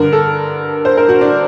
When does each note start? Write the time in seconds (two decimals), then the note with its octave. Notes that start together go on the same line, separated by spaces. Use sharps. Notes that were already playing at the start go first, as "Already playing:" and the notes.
Already playing: G2 D3 A#4
0.13 A4
0.85 C5
0.97 A#4
1.09 F#4
1.21 D4